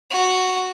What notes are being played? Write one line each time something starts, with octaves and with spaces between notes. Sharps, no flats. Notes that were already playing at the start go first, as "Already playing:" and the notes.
F#4